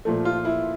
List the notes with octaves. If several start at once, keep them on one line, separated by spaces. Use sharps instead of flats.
A#2 F3 A3
F4
E4